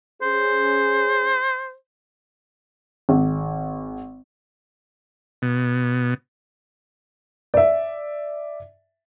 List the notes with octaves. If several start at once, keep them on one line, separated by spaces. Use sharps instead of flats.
C#4 G#4 C5
G#1
B2
D5 E5